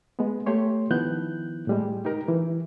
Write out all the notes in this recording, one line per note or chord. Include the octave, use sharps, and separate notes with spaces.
G#3 B3
A3 G4 C#5 C6
D#3 F3 B3 E4 F#6 G6
A2 G3 G#3
D#4 G4 A#4
E3